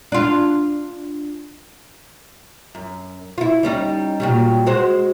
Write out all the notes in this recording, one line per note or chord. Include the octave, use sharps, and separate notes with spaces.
D4 F4
F#2
E4 F4
G3 C#4 D#4
A#2 F#3 G3
G#3 F#4 C5